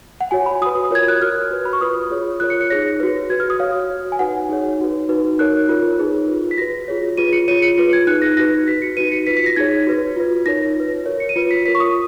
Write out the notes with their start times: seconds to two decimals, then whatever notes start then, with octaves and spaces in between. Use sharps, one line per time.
0.21 F#5
0.31 F#4 C#5 G#5
0.46 B5
0.62 F#4 B4 D#6
0.91 F4 A#4 C#5 G#6
1.08 F#6
1.21 F#4 A#4 C#5 F6
1.51 F#4 B4
1.65 B5
1.73 C#6
1.81 F4 B4 D#6
2.10 F4 G#4 C#5
2.40 F4 A#4 C#5 F#6
2.50 C#7
2.61 C#7
2.70 D#4 G#4 C#5 A#6
3.00 F#4 B4
3.30 F#4 B4 G#6
3.40 F6
3.50 D#6
3.60 F#4 C#5 F5
3.90 F#4 C#5
4.12 G#5
4.19 D#4 F#4 B4 F#5
4.49 D#4 G#4 C#5
4.79 D#4 F#4 B4
5.09 D#4 F#4 B4
5.39 D#4 A#4 C#5 F#6
5.69 F4 A#4 C#5
5.98 D#4 G#4 B4
6.28 F4 B4
6.51 B6
6.58 F#4 B4 A#6
6.88 F4 G#4 C#5
7.18 F4 G#4 B4 D#7
7.33 C#7
7.48 F4 G#4 C#5 D#7
7.62 C#7
7.78 F4 B4
7.93 G#6
8.07 D#4 G#4 B4 F#6
8.22 A#6
8.37 D#4 F#4 B4 A#6
8.67 F#4 B4 B6
8.82 C#7
8.97 D#4 F#4 B4 D#7
9.12 C#7
9.27 F4 B4 B6
9.37 B6
9.46 A#6
9.56 D#4 G#4 C#5 G#6
9.87 F#4 B4
10.16 F4 B4
10.46 D#4 A#4 C#5 A#6
10.76 F4 B4
11.06 F#4 A#4 C#5
11.20 C#7
11.29 D#7
11.36 F4 B4 C#7
11.51 B6
11.65 F4 A#4 C#5 B6
11.75 C#6
11.80 D#6